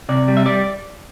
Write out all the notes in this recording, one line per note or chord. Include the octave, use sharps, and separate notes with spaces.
C3 D5
G3
E5
G3 D5